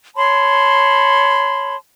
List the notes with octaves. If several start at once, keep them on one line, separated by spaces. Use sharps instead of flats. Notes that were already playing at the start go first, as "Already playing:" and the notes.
C#5 A5 B5 C6